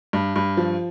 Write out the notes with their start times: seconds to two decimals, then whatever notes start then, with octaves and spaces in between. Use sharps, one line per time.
0.13 G2
0.36 G2
0.57 F3